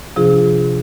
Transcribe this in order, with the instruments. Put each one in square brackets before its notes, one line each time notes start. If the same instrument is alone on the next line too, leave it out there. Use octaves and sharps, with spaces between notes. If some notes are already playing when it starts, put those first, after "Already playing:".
[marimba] C3 F3 D4 F4 G#4